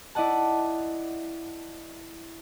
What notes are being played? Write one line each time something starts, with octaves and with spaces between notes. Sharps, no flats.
E4 D5 D#5 F#5 A5